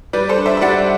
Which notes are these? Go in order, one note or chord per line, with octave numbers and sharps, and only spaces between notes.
G3 B4 D5
A4 C5
D4
C5 E5
E5
G3 D5 F#5